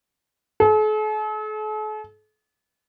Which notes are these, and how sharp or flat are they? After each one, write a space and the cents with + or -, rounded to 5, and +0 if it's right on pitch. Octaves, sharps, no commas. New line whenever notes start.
A4 -45